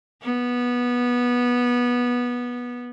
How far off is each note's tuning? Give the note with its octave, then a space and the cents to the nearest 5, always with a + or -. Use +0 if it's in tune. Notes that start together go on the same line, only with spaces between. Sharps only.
B3 -15